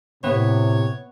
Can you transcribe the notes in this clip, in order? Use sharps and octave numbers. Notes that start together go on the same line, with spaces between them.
A2 C3 B3 C#5 E5